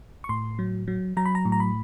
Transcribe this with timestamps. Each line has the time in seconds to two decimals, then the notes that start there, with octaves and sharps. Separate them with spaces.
0.24 C#6
0.29 A2 C6
0.59 F#3
0.88 F#3
1.17 F#3 A#5
1.25 B5
1.35 A#5
1.45 A2
1.52 A#5
1.60 B5